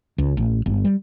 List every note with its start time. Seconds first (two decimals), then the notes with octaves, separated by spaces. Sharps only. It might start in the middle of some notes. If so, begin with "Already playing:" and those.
0.18 C#2
0.37 A1
0.66 G1
0.85 G3